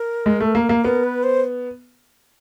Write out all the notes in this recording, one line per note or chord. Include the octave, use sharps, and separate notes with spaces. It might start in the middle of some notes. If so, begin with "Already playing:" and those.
Already playing: A#4
G#3
A3
A#3
A#3
B3 A#4
B4
C5